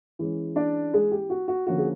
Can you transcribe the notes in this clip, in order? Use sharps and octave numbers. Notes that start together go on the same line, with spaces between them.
E3 G#3 C#4
D4 D5
G#3 G#4
G4
F#4
F#4
D3 F3 A#3 C#4 F#4
G#4